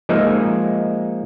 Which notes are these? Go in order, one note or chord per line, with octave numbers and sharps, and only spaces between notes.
F3 G#3 A#3 D#4 E5